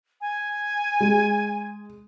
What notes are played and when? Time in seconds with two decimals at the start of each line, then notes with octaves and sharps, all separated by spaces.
0.21 G#5
1.00 G#3